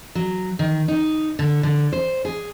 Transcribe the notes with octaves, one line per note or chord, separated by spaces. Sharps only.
F#3
D#3
D#4
D3
D3
C5
G#4